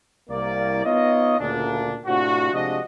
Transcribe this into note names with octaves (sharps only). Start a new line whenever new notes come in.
C2 A#3 D5
B3 D#4 F4 C#5 D#5
D2 A#2 C#3 D4
A2 C3 D4 F4 F#4
C3 F3 G#3 D4 F#4 D#5